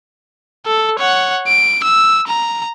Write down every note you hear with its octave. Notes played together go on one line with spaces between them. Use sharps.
A4
C#5 F#5
D7
E6
A#5